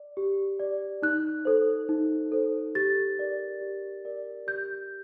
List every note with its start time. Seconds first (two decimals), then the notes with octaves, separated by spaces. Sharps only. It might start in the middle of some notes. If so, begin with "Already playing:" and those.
Already playing: D5
0.17 G4
0.60 D5
1.02 D#4 F#6
1.45 A4 C5
1.89 D#4
2.32 A4 C5
2.75 G4 A6
3.18 A#4 D5
3.61 G4
4.05 A#4 D5
4.47 G4 G6